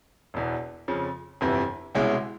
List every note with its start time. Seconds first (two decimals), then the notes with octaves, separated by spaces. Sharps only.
0.34 E1 E2 B2
0.88 F2 C#3 F3
1.41 G1 F2 C3 E3
1.95 C2 B2 G#3 C#4 E4